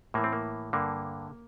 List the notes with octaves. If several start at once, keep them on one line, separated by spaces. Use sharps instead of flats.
A2 E3 A#3
C4
A#3
G2 D3 A#3